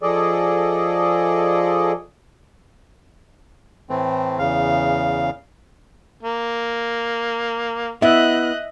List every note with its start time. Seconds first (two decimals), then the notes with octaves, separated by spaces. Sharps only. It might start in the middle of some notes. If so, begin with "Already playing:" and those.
0.03 F3 G#4 A4 D5 D#5
3.90 A2 E3 A3 C4
4.39 E2 C#3 F5
6.23 A#3
8.02 B3 E4 D#5 E5 F#6